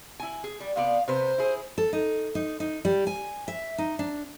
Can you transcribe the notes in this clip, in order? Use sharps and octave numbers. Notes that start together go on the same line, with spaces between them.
E4 G#5
G#4
G3
C3 B3 D5 F5
C3 B4 C5
E4 G#4
A4
D#4
D#4
D#4
G3
G#5
E5
D#4
D4